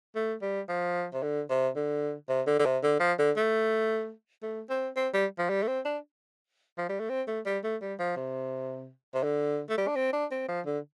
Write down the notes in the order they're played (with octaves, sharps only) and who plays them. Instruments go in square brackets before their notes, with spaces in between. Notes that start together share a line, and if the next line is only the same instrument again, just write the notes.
[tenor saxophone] A3
G3
F3
C3
D3
C3
D3
C3
D3
D3
C3
D3
F3
D3
A3
A3
C4
C4
G3
F3
G3
A3
C4
D4
F3
G3
A3
C4
A3
G3
A3
G3
F3
C3
C3
D3
A3
G3
D4
C4
D4
C4
F3
D3